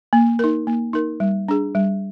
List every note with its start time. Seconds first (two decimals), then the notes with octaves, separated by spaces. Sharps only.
0.13 A#3
0.39 D#4 A#4
0.67 A#3
0.93 D#4 A#4
1.20 G3
1.49 D4 G#4
1.75 G3